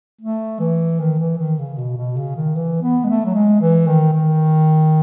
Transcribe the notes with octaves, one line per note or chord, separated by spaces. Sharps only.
A3
E3
D#3
E3
D#3
C#3
B2
B2
C#3
D#3
E3
B3
G#3
A3
F#3
G#3
E3
D#3
D#3